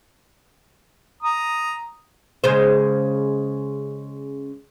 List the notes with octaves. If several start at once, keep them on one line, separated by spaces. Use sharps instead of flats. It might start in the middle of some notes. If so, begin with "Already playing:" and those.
A#5 D#6
C#3 G#3 C5